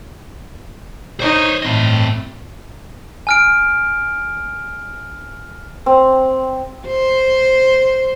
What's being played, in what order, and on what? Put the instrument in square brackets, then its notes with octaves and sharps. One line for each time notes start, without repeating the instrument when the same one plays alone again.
[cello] D#4 [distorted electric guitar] C5 C#5
[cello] A2 [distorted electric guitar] C4 D#5
[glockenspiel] G#5 F6 D7
[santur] C4
[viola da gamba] C5